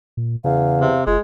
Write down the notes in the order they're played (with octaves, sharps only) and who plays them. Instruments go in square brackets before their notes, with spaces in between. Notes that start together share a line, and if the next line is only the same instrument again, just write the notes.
[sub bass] A#2
[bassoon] E2 [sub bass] C#3 [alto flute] F5
[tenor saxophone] C3
[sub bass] F#1 [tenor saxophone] G#3 [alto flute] F4